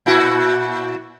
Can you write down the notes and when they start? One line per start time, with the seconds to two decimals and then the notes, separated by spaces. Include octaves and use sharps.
0.06 A#2 E4 F#4